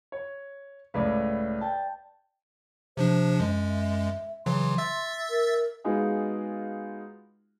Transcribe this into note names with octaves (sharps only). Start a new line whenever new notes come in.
C#5
C#2 A2 B4 D5
G5 A5
C3 F3 D4 C5
F#2 G#3
E5
C#3 E3 F#3 C6
E5 E6 A6
A#4
G#3 B3 D#4 F4 F#4 G#4